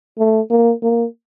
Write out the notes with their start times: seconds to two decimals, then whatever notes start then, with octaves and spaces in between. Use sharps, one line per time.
0.18 A3
0.50 A#3
0.83 A#3